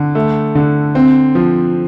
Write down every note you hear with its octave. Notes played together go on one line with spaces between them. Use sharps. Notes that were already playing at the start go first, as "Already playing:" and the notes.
Already playing: D3
A3
D3
C4
F3